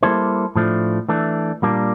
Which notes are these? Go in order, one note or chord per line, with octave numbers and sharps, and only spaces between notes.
G3 A#3 E4 A4 C5
A2 F3 A3 D4
E3 A3 D4
A#2 G3 A#3 D4